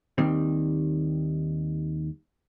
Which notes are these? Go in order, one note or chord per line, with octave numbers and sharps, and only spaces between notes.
D#2 D#3 G3 C4